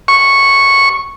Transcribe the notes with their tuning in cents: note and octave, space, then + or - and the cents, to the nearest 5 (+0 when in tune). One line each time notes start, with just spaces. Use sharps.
C#6 -5